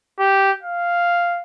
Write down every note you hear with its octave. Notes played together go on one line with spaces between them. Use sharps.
G4
F5